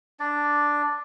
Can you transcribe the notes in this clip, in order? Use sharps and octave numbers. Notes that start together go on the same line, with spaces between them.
D4 D5